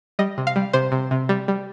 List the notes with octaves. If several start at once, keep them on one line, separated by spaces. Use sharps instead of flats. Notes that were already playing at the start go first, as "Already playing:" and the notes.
G3 D#5
C3
F5
G3
C3 C5
C3
C3
G3
G3